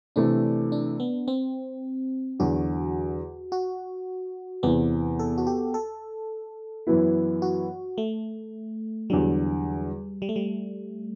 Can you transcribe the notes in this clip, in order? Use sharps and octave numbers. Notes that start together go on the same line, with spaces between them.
C3 E3 A3 D4
D4
B3
C4
E2 D3 F#3 F#4
F#4
E2 C3 E3 B3
A4
F#4
G4
A4
F#2 E3 B3 E4
F#4
A3
E2 D3 F#3 G3
G3
A3
G3